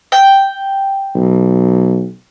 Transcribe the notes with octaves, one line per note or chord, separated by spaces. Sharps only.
G5
B1